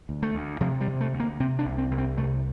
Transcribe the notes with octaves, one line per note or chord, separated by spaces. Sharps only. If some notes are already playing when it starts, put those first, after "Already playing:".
D2
A3
D2
C3 F3
G3
C3
A3
D2
A#3
C3 C4
D4
C2
C4
C2
C4
C3 A3